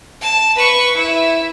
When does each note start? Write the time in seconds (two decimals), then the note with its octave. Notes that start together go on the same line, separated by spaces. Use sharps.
0.21 A5
0.56 B4 C#6
0.95 E4 E5